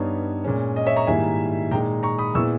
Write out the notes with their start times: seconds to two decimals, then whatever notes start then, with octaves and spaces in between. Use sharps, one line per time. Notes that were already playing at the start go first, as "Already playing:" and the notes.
Already playing: G2 G3 B3 D#4 C#5
0.44 A#2 G#3 C#4
0.76 D#5
0.86 C#5 E5
0.96 A#5 C#6
1.07 G#2 D#3 G3 A#3 E4 E5 G#5
1.71 A#2 G#3 D#4 G5 A#5
2.03 A#5 C#6
2.19 B5 D#6
2.35 A#2 G#3 B3 E4 C#6 E6